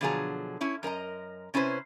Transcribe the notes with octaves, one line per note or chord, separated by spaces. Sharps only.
B2 D3 F3 F#3 G#4 A#5
C#4 E4 C#5
F#2 A#4 D#5 A#5
C3 C#4 E4 B4 C5